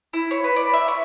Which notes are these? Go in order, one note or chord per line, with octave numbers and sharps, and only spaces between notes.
E4
C#5
B4
D5
E5
C#6